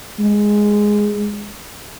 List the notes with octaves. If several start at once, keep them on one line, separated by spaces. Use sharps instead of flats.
G#3